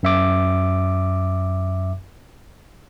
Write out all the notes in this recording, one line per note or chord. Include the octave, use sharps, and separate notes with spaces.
F#2 E5 D6